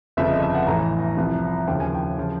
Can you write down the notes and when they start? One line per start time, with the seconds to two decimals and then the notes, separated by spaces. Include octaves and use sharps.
0.17 G1 F2 C#3 F3 E5
0.30 D#5
0.42 E5
0.55 F#5
0.67 A1 A2 E3 A#5
1.17 C2 C3 F3
1.67 D#2 C#3 F3 G5
1.80 G#5
1.94 G5
2.18 C#3 F3